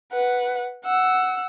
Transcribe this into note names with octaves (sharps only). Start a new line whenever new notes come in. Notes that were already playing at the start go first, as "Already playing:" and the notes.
B4 F#5
F#5 E6